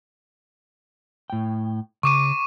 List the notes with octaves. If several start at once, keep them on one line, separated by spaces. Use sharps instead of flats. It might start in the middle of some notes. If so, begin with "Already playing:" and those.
A2 G5
C#3 C#6 D6 D#7